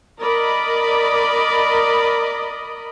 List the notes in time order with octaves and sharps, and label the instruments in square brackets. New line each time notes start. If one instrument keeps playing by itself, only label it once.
[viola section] A#4 D5 D#5 B5